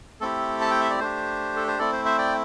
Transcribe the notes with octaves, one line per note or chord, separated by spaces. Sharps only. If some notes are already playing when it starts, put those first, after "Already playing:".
A3 C4 E4 G4 A4
A5
G5
E5
D5
A3 D4 G4 C5
A4
C5
A3 C4 E4 A4 D5
C5
C5 E5
D5 G5